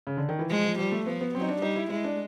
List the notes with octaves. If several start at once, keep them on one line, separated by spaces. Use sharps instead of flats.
C#3
D3
D#3
E3
F3 G#3
F3
F3 G3
A3
F3 B3
B3
F#3 C4
D#4
D4
G3 D#4
E4
G#3 E4
D4